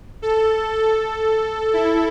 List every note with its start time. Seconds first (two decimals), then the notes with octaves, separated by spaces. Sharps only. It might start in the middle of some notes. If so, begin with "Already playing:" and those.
0.22 A4
0.73 A4
1.74 E4